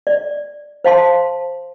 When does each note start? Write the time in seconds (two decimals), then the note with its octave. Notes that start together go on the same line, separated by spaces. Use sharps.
0.07 D5
0.84 C5 F5 A5 C6